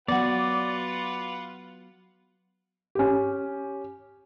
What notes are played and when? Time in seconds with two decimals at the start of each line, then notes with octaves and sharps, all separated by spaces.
0.08 F#3 B3 D#4 F4 F#4 B4 D5 F#5
2.95 C#4 G4